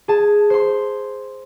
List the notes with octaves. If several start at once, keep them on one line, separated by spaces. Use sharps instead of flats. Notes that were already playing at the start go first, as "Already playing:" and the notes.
G#4 A5
C5 C6